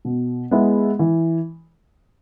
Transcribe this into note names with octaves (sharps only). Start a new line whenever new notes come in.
B2
G#3 B3 E4 G#4
E3